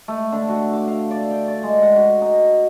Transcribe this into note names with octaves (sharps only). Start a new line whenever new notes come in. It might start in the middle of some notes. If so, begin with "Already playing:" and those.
A3
D3
F#4
D6
F5
D5
G5
D5
G#3
F#5
F#4
D#4